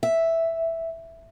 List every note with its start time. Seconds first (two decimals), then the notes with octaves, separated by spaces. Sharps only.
0.03 E5